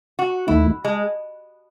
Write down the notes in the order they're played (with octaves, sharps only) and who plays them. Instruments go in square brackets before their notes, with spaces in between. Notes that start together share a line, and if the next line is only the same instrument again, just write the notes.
[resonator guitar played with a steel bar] F#4
[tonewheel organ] D#2 D#3 A3 D#4 [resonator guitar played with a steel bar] E4
[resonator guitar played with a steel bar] G#3